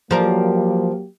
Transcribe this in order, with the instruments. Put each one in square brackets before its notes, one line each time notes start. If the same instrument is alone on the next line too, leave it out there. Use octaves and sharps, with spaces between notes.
[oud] F3 A#4 D5 [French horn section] F#3 A#3 G4